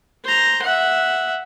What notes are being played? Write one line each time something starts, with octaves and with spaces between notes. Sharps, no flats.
C5 A#5
E5 F#5